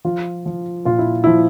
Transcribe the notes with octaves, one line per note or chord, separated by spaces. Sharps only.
F3 F4
F3
A#2 F4
E4
F3 E4